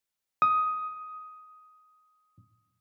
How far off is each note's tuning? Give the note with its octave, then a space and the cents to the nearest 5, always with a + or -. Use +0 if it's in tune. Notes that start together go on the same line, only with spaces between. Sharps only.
D#6 +10